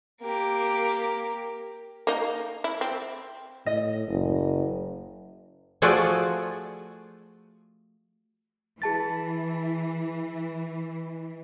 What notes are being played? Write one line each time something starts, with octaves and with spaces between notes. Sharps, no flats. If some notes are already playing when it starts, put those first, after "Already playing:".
A#3 G4
A#3 D#4
E4
C4
A2 D#5
F#1
F3 A3 F4 F#4 G#4 D5
E3 G#4 A5 A6